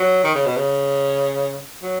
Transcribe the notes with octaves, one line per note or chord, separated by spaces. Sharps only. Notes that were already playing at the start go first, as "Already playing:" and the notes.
Already playing: F#3
D#3
C#3
B2
C#3
F#3